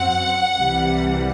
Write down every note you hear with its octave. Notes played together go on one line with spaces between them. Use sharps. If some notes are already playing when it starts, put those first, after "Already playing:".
Already playing: F#2 F#3 C4 F#5
C2 C3 E3 G3